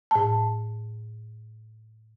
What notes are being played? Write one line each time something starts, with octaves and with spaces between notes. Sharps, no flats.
A2 A5